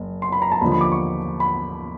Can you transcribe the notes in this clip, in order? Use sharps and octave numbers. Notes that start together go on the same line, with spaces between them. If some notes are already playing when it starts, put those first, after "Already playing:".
Already playing: F#1
C6
B5
A#5
A5
D#2 D3 F3 B5
B5
D6
C#6
B5